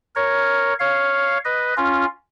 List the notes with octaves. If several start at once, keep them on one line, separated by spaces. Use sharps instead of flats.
A#4 C#5
C#5 F5
B4 D#5
C#4 F4